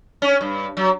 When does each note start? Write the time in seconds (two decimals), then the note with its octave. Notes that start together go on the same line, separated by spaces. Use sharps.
0.22 C#4
0.41 G2
0.77 F#3